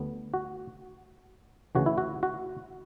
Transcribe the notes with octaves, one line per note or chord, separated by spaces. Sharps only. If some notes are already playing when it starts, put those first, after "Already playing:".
Already playing: D2 D3 G3 B3
F#4
D2 C#3 E3 F#4
E4
F#4
F#4